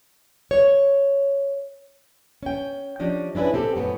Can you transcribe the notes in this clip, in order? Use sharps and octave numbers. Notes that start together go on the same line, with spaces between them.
C#5
C#4 G5
F3 C#4 D4 G4 D#5
C#4 D4 E4 G#4 B4
C4 G4 A4
F#2 A2 F3 B3 C#4